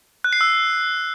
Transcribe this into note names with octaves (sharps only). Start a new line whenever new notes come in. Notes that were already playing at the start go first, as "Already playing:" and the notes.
F#6
C7
E6